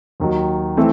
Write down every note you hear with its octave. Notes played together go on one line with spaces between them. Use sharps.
D#2 D#3 F#3
E3 A3 C4